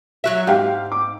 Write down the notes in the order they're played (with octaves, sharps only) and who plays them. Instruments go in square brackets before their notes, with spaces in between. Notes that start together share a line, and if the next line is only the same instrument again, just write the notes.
[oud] F#3 F#4 E5
[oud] G#2 [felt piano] G4 F5 G5
[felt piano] D6